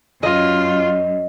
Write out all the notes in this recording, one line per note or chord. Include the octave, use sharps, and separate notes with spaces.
F#2 F4 D#5